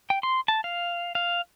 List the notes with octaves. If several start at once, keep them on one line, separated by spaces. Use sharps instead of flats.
G5
C6
A5
F5
F5